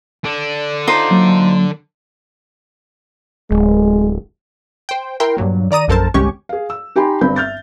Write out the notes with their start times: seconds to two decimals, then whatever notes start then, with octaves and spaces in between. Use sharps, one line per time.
0.24 D3 D4
0.88 D#4 F4 C5
1.11 F#3 A#3
3.51 D1 G#3
4.89 C5 G5
5.20 E4 A#4 G5 C6
5.37 G2 A#2 F#3 A#3
5.71 D#3 D5 A#5 D#6 D#7
5.88 A#1 F#2 A4 A#4 C5 A5
6.14 G1 C2 G#3 C#4 G4 C#6
6.49 G#4 F5
6.70 E6
6.96 D#4 G4 G5 G#5 B5 C6
7.21 G1 G2 C4 B4 B5 G6
7.36 E5 F6 G6 A6